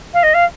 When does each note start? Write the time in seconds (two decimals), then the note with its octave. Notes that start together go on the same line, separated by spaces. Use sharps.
0.13 F5
0.23 D#5
0.34 F5